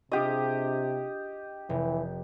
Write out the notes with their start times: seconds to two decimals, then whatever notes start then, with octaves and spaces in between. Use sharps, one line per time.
0.12 C3 D4 F4 G4 G#4 D#5
1.69 F1 E3